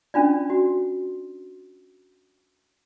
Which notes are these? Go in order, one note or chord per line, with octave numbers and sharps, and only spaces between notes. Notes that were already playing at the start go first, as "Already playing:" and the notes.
C#4 D4 F4 D5
F#4